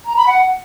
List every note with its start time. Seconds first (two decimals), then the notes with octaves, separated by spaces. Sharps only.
0.05 A#5
0.16 B5
0.27 F#5